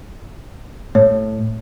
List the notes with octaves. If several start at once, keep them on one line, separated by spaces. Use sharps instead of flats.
A2 C#5